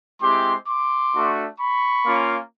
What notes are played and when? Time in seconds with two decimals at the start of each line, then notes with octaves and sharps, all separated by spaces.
0.21 G#3 C4 E4 G4 C6 D6
0.67 C6 D6
1.13 A3 D4 F#4
1.58 B5 C#6
2.04 A#3 C#4 F4